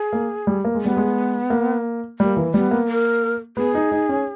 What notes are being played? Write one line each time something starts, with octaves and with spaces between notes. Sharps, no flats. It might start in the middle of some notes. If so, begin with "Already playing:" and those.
Already playing: G#4
A#3
G3
A#3
G#3
G3 B3
G#3
A#3
G3 A#3
E3
G3 B3
A#3
A#4
B3 G#4
D#4
D#4
C#4